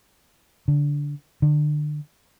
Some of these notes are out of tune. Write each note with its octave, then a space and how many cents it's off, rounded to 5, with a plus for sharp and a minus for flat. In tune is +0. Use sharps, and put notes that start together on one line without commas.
D3 -15
D3 +30